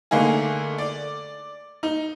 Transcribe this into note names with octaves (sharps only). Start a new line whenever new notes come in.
D3 A3 A#3 D#4 G#4
D5
D#4